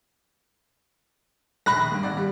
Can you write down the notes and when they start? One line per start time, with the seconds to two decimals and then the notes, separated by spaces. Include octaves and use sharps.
1.66 A#1 D#2 B5 F#6 A#6
1.91 G2 A#3
2.03 G#1 D5
2.17 G3